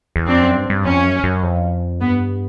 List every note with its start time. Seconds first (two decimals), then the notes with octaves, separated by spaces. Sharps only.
0.16 E2
0.27 F2 C4 D4
0.42 F#2
0.56 G2
0.70 G2
0.84 F2 C#4
1.04 F#2
1.24 F#2
1.43 F2
2.01 G2 B3